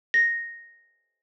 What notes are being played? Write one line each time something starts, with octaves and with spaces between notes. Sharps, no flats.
A#6